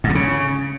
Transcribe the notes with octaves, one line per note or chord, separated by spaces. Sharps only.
G#2
C3
C#3